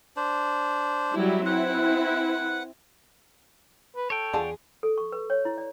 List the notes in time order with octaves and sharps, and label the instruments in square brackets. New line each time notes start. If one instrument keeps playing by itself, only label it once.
[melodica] D4 C5
[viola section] F#3 G3 E4
[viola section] C4 E4 [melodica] B4 F#5
[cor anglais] B4
[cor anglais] A4 [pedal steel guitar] C#5 G5
[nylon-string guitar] E2 G#4 [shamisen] D3 F4 A5
[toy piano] A4
C#6
B4
C#5
E4
D5